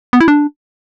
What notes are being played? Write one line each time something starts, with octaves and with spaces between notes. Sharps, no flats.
B3
E4
D4